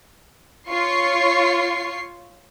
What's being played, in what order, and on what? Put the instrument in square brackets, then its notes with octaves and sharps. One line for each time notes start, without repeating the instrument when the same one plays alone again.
[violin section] F4 C#5 C#6 C7